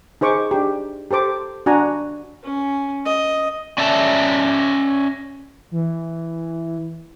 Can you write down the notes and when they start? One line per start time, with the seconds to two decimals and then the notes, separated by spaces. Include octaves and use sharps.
0.21 D#4 G#4 C5 C#6 D6
0.51 D4 G4
1.11 G4 A4 C5 D6
1.66 D4 F#4 G#5 A#5
2.43 C#4
3.06 D#5
3.78 C#4 D5 E5 A5
5.71 E3